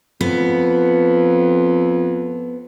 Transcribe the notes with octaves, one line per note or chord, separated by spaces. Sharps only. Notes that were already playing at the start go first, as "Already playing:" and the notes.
F2 B3